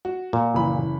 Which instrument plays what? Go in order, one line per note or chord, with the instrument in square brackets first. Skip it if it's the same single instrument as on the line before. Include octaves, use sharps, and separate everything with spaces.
[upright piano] F#4
[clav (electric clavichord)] A#2
[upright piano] F#1 E3 B5